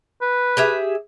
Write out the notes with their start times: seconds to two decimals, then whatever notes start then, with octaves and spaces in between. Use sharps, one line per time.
0.21 B4
0.57 G4 G#4 E5